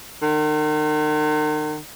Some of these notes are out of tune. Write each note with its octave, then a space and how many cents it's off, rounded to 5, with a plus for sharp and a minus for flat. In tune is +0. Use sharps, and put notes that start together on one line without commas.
D#3 -40